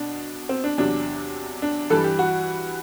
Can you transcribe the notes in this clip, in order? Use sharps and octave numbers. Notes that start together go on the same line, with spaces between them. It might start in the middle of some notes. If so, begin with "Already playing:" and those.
Already playing: B2 D4
C4
D4
E2 C3 F#3 D4
D4
G2 E3 G3 A4
G4
F#4